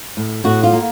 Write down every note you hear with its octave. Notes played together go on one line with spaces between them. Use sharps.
A2
A2 F#4
F4
A#3